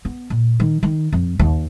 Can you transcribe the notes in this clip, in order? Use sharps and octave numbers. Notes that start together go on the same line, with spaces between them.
B3
A#2
D#3
D#3
F2
D#2